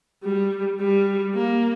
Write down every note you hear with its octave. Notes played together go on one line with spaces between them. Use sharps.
G3
G3
A#3